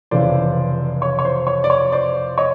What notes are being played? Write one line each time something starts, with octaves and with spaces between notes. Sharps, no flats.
F1 E2 C#3 E3 C5 D5
C#5
C#5
C5
C#5
D5
C#5
C5 D5
C#5 D#5